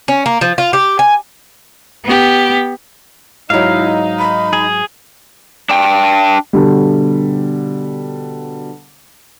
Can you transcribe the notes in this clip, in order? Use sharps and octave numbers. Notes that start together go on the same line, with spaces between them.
C#4
A#3
F3
F4
G4
G#5
B3 G4
G#2 F#3 D#4 E4 F5
B5
G#4
D4 G5
B2 D3 G3